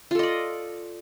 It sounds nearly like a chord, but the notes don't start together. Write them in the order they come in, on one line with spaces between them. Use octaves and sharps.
F4 A4 D#5 D5